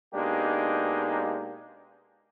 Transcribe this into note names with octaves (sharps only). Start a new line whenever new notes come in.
B2 G#3 A#3 D4 D#4 G4